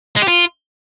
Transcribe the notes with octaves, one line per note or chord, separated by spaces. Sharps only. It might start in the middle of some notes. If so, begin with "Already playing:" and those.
G#3
G4
F4